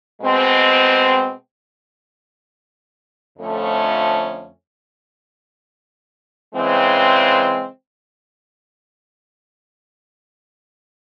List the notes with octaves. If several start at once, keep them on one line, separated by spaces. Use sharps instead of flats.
B2 G#3 C4
F2 D3 F3 A3 C#4
C#3 E3 G#3 C4